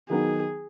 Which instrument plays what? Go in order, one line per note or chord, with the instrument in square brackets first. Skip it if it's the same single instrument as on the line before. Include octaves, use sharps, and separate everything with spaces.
[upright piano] D#3 F#3 B3 D#4 [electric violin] G#4